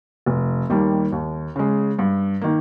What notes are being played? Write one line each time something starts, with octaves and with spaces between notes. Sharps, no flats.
F1
D#2 D#3 G3 A#3
D#2
C#3 G#3
G2
D#3 A#3